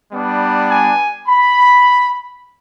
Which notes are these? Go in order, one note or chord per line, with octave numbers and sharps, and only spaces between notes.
G3 B3 D4
G#5
B5